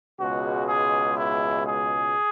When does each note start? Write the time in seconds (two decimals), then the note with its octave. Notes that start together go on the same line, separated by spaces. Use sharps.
0.19 C#2 B2 G#3 F#4
0.68 G#4
1.17 E4
1.66 G#4